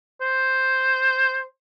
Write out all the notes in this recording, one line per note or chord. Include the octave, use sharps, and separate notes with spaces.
C5